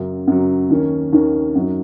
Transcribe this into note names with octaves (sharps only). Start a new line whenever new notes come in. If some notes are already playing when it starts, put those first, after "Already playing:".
Already playing: F#2 C#3 F#3
F#2 C#3 F#3
D#2 D#3 A#3 C#4
D#2 D#3 A#3 C#4
F#2 F#3 D#4